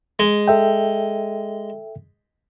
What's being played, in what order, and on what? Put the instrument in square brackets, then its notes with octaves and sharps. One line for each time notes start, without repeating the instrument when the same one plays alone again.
[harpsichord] G#3
[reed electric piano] A4 E5 G5